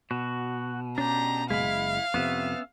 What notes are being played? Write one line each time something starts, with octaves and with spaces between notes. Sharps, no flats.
B2 F#4
C#4 D4 G4 A#5
F#1 G#3 E4 F5 B5
F2 C3 B3 C#4 E5